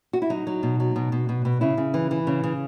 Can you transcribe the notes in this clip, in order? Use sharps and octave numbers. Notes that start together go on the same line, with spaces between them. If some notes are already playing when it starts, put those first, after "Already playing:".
F#4
E4
F#3 D#4
F#3
B2
F#3
B2
B2
B2
B2
C#3 E4
C#3
E3
E3
C#3
C#3